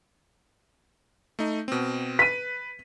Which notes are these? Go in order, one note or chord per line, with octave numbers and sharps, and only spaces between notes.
A3 D#4
B2 C4
B4 B6 D#7